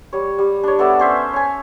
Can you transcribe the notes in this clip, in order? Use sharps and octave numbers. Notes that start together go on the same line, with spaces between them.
G3 C#5
G3
D4 C#5
B3 A4 D5 E5
C#4 C5 E5
C#5 G#5